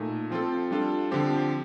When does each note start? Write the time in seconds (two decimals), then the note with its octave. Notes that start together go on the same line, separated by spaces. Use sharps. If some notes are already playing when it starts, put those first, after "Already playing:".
Already playing: A#2 A3 D#4
0.30 F3 C4 F4 A4
0.71 G3 D4 F4 A4
1.11 D3 F3 C4 G4